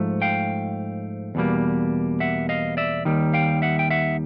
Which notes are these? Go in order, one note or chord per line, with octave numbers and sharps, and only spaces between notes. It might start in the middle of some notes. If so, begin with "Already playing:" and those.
Already playing: G#2 F3 A3
F5 G5
E2 B2 G3 A#3
E5 F#5
D#5 F5
D5 E5
D#2 D#3 G3
F5 G5
E5 F#5
G5
E5 F#5